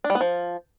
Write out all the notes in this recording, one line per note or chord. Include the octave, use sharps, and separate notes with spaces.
D4
G3
B3
F3